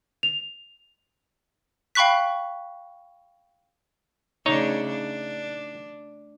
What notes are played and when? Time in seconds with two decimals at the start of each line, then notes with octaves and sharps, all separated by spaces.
0.23 F7
1.95 F5 G5 B5 C#6 F#6 B6
4.46 C#3 A3 D4 D#4 C#5
4.88 D4